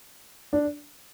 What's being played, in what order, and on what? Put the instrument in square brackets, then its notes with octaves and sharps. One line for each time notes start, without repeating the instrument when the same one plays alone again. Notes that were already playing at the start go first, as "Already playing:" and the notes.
[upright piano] D4